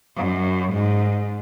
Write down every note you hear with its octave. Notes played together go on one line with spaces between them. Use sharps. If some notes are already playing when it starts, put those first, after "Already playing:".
F#2
G#2